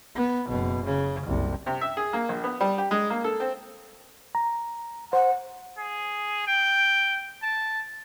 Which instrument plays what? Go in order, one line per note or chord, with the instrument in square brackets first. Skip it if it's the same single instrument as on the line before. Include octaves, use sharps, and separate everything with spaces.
[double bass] B3
F#1 B2
C#3
F#1 C2
[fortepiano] C3
E5
G#4
A#3
A#1
B3
G3
G4
G#3
A#3
A4
C4
[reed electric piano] A#5
[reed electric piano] C5 [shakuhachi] F#5
[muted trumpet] G#4
G5
A5